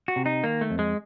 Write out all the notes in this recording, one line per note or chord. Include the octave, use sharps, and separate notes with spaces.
F#4
C3
D#4
D#3 A#3
A3
F2
G#3